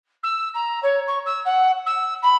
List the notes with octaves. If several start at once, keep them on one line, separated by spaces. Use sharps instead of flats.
E6
A#5
C#5
C#6
E6
F#5
E6
B5